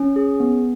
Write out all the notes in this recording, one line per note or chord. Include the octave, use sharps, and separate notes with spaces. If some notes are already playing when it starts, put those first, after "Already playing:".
Already playing: C#4
G#4
B3